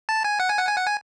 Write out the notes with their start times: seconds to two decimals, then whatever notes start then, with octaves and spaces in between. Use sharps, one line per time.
0.09 A5
0.24 G#5
0.40 F#5
0.49 G#5
0.58 F#5
0.67 G#5
0.77 F#5
0.86 G#5